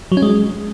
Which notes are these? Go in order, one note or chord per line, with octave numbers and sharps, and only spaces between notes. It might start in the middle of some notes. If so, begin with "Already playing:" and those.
F#3
C#4
G#3